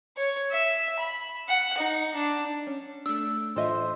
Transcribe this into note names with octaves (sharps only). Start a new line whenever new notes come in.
C#5
E5
B5
F#5
D#4
D4
C#4
A3 D4 E6
A2 E3 F4 A4 C5 D#5 E5